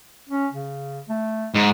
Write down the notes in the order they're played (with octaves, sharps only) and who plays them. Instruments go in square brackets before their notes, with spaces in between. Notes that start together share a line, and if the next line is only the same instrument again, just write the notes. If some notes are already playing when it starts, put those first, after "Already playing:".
[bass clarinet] C#4
C#3
A3
[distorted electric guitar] G#2